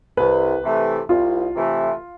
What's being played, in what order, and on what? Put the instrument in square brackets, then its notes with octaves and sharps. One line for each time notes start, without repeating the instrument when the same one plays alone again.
[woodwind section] C2 [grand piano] B4
[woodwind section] C3 E3 A3
[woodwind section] C2 [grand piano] F4
[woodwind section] C3 E3 A3